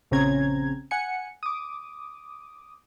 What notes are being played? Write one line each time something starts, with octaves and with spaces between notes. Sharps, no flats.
A#1 C#3 C4 C#4 A#5 G#6
F#5 G#5 C#7
D6 D#6